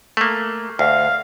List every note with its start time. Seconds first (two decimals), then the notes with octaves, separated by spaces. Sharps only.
0.17 A3 A#3
0.79 D2 F5